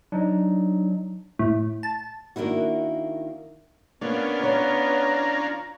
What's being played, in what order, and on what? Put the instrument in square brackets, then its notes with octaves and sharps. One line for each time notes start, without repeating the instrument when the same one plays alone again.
[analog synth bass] F#3 [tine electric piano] D4 D#4
[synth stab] A2
A5
[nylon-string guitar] D#3 A#3 D4 E4 F#4
[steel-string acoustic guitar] A#3 [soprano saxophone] B3 [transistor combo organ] C#4 D4 F4
[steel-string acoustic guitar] E3 C#5 [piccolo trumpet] A#5